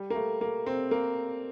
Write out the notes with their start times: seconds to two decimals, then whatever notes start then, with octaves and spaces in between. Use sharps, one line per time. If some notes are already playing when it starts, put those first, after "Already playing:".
Already playing: G3
0.10 A#3
0.15 A3
0.41 A#3
0.66 C4
0.91 A#3